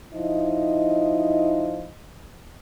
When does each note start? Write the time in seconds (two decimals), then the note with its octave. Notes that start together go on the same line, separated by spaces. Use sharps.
0.12 F3 D#4 E4 D#5